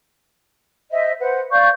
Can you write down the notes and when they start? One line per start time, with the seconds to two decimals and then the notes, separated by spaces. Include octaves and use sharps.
0.91 C5 D#5 E5
1.20 B4 C5 F#5
1.51 D5 F5 C#6 G6